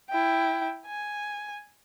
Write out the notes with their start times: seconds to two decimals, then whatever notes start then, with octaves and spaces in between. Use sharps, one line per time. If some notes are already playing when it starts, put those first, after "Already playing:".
0.10 E4 G5
0.87 G#5